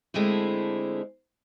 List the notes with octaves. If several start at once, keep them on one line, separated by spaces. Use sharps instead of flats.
D3 G#3 A3 C4 E4